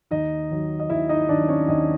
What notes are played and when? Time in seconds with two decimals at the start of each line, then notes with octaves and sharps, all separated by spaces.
0.11 D#2 D#4 D#5
0.51 D#3 F#3
0.80 D#5
0.90 D#2 E4 E5
1.09 D#4 D#5
1.29 D#3 F#3 D4 D5
1.48 C#4 C#5
1.68 D#2 D#4 D#5